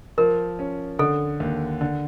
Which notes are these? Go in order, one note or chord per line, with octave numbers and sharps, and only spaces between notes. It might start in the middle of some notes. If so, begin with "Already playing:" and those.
F3 A#4
C#4
D3 A4
D#2
D3